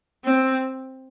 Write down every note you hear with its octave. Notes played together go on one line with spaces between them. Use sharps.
C4